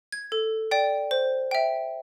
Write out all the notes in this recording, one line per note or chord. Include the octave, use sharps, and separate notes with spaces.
G#6
A4
D5 G5
C5
E5 G5